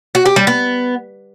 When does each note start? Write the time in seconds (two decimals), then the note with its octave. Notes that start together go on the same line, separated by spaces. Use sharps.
0.15 F#4
0.26 G4
0.36 G3
0.47 B3